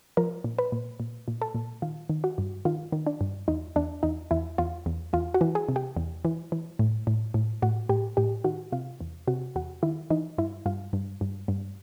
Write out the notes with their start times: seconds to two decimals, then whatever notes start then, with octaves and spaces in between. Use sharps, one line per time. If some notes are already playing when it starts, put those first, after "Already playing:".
0.17 F3 A#4
0.44 A#2
0.58 B4
0.72 A#2
1.00 A#2
1.28 A#2
1.42 A4
1.55 A#2
1.82 D#3 F4
2.10 D#3
2.24 F#4
2.38 G2
2.65 D#3 F4
2.92 D#3
3.07 D4
3.21 G2
3.48 E2 D#4
3.76 E2 D4
4.03 E2 D#4
4.31 E2 E4
4.58 E2 F4
4.86 E2
5.13 E2 F4
5.34 F#4
5.41 E3
5.55 G#4
5.69 C3
5.76 G4
5.97 E2
6.25 E3
6.52 E3
6.79 A2
7.07 A2
7.34 A2
7.62 A2 F#4
7.89 A2 G4
8.17 A2 G4
8.44 D#3 F#4
8.72 C3 F4
9.01 E2
9.28 C3 F#4
9.56 E2 F#4
9.83 D#3 E4
10.10 E3 D#4
10.38 G2 E4
10.66 G2 F4
10.93 G2
11.21 G2
11.48 G2